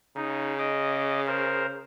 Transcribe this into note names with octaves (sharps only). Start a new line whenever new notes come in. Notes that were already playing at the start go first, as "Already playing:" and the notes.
C#3 D#4
D#5 D6
A#4 C5